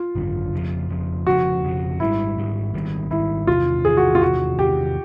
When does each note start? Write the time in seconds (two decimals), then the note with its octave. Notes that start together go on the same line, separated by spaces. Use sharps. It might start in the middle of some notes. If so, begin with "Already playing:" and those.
Already playing: F4
0.15 G#1 F#2 D3
0.53 F1 F2 C#3 F3
0.89 F1 F2 C#3 F3
1.26 F1 F2 C#3 F3 F#4
1.63 F1 F2 C#3 F3
2.00 G#1 G#2 D#3 G3 E4
2.37 G#1 G#2 D#3 G3
2.74 G#1 G#2 D#3 G3
3.10 G#1 G#2 D#3 G3 E4
3.47 E2 C3 D#3 F4
3.85 E2 C3 D#3 G#4
3.97 F#4
4.15 F4
4.21 E2 C3 D#3 F#4
4.59 E2 C3 D#3 G4